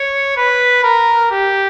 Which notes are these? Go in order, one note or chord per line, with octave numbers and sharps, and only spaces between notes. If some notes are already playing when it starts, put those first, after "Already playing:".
Already playing: C#5
B4
A#4
G4